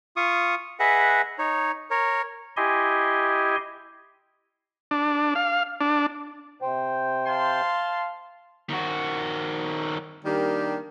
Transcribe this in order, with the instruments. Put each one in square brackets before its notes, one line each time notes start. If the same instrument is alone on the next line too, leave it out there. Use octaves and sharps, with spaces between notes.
[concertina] F4 C#6 D#6
G#4 B4 D#5 E5 F#5
D#4 C#5
A#4 C#5
[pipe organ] E4 G4 D#5 G#5 C6
[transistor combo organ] D4
F5
D4
[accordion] C3 C5 G5
[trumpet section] F5 A5 C6
[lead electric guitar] D#3 F#4
[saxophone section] D#3 G3 A#3 D4 G4